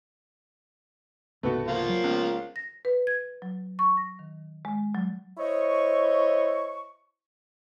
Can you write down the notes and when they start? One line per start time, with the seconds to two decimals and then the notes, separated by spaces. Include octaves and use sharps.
1.43 C#2 G#2 C3 A3 B3 F#4
1.67 F3 A#3 F4
1.89 F#3
2.04 C#2 B3
2.56 A#6
2.85 B4
3.07 G#6
3.42 F#3
3.79 C#6
3.97 A#6
4.19 D#3
4.65 G#3
4.95 F#3
5.37 E4 C5 C#5 D#5 C#6